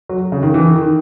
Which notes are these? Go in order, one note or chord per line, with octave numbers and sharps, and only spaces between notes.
F#3
C#3
D#3
E3
D#3
D#3